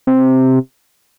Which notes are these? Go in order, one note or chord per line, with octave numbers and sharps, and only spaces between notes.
C3